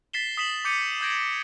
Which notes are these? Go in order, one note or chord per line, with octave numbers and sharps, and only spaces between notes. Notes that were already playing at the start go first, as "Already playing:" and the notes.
A6 B6 C7 E7 G7
D#6 B6 E7 F#7
D6 G6 C#7 D#7
D#6 G6 G#6 A#6 D7